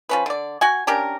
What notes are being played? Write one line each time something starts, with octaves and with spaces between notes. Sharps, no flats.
F3 C#4 B4
D3 D5
F#4 F#5 G#5
C#4 D4 G4 A#4